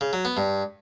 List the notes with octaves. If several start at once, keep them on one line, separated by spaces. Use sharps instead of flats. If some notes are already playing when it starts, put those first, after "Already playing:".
C#3
F#3
B3
G2